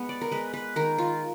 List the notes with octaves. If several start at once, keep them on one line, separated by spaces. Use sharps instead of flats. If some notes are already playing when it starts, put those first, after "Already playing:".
Already playing: G#3 B3
D5
A#4
G#3 B4
B4
D#3 A#4
F4